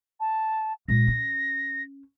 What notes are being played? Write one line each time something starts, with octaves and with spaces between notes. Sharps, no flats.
A5
A#2 G#3 A#6
C#4